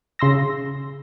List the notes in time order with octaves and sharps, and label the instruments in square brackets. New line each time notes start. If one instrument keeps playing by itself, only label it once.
[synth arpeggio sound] C#3 C6 E6 A#6